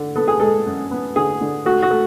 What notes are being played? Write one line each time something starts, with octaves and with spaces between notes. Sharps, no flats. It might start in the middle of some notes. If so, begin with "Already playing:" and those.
Already playing: D3
B3 A4
G#4
G#3 A4
F#2
B3
D3 G#4
D3
A3 F#4
F#4
A3